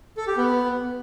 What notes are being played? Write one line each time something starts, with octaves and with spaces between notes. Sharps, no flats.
A4
G4
B3